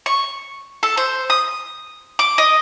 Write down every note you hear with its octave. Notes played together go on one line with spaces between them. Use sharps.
C#6
A4
C5
D#6
D6
D#5